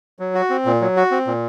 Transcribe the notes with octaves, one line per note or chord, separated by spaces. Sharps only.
F#3
F#4
C4
A#2
F#3
F#4
C4
A#2